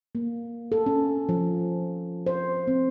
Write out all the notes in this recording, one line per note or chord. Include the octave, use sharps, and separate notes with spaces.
A#3
A4
C#4
F3
C5
C4